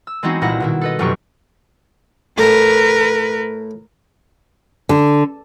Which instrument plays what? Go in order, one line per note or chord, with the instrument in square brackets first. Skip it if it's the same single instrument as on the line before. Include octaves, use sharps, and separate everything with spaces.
[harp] E6
E3 G#3 B3 C4 D#4 F#4
C2 A#2 E4 F#5 A#6
B2 D#3 E4
A4 B4 D#5
F1 F#2 B2 F#3 G4 C#6
[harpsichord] A2 A3 [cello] A#4 B4
[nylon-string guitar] D3